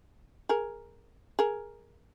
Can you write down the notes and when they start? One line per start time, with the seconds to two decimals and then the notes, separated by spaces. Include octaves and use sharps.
0.49 G#4 A#4
1.39 G#4 A#4